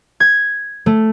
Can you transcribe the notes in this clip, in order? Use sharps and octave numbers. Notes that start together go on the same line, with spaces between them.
G#6
A3